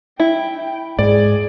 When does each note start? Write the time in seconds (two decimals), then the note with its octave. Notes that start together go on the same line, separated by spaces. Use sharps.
0.20 E4 G5
0.99 G#2 G#4 D5